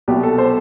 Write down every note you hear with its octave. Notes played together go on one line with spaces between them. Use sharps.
C2 B2 F#3 G4
A4
C5